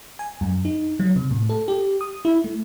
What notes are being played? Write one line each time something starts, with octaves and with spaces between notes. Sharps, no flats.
G#5
F#2
D#4
F#3
C3
A2
A4
G4
D#6
E4
A3